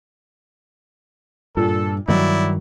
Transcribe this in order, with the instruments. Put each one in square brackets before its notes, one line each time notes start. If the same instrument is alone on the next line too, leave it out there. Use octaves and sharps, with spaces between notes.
[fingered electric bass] G2 [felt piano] A#2 [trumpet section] A4
[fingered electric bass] G2 D#3 G3 [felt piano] F#3 [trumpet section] E4 D5